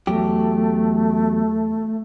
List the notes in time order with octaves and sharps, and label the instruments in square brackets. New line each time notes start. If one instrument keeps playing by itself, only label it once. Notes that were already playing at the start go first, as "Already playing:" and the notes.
[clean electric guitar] E2 F#3 G4 [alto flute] A3